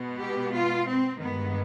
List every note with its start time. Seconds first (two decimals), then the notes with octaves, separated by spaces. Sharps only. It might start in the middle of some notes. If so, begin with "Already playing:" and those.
Already playing: B2 G#3 B3
0.19 G4
0.53 F4
0.87 C4
1.20 G2 D#3 G#3 B3